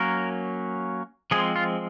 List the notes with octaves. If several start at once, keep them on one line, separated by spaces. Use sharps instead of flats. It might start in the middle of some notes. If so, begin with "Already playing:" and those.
Already playing: F#3 A#3 C#4 A#4
F3 G#3 C4 G#4
F4